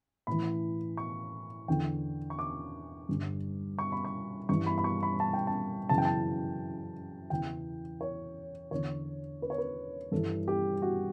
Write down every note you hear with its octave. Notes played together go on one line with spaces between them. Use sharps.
A2 E3 B5
C#6
E2 D3 G5
C#6
D6
G2 D3
C#6
B5
C#6
G2 E3 C#6
B5
B5
C#6
B5
A5
G5
A5
F#2 C#3 E3 A5
G5
A5
E2 C#3 E3 G5
C#5
E2 D3 C#5
B4
C#5
B4
G2 E3 A4
G4
F#4